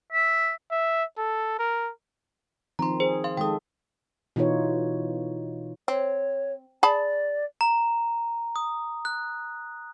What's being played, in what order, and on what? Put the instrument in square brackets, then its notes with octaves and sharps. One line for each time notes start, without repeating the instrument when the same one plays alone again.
[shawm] E5
[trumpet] E5
A4
A#4
[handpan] D#3 F3 C4 [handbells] A#5 C6
[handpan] G#4 [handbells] C5
[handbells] F5 C6
[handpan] D#3 G#3 A4 [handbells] G5 D#6
[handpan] B2 E3 D#4 F4 C#5
[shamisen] C4 [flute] C#5
[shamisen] G#4 A5 B5 [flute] D5
[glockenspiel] A#5
D#6
F#6